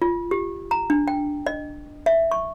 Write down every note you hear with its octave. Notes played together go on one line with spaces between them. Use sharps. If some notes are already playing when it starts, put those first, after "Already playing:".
F4
G4
A#5
D4
G5
D#5
E5
C#6